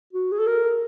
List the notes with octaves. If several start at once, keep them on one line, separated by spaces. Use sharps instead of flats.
F#4
G#4
A4
A#4